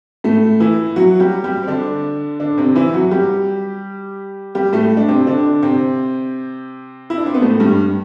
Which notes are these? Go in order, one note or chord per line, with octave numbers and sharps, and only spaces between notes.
A2 A3
E3 E4
F#3 F#4
G3 G4
G3 G4
C4
D3 D4
D3 D4
C3 C4
E3 E4
F#3 F#4
G3 G4
G3 G4
A2 A3
D4
C3 C4
D3 D4
C3 C4
E4
D4
C4
B3
A2 A3
G2 G3